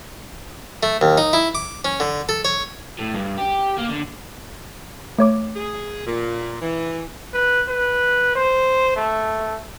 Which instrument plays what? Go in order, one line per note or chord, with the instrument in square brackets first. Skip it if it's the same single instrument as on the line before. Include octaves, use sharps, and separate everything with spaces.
[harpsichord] A3
D#2
D#4
E4
D6
C#4
D3
A4
C#5
[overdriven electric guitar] A2
G2
G4
A#3
D3
[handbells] A3 C#5 D6
[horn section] G#4
A#2
E3
[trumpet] B4
B4
C5
A3